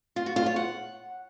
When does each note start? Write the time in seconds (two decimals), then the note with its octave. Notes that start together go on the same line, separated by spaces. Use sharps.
0.16 F4
0.26 F#4
0.36 F4
0.46 C#5
0.56 F#5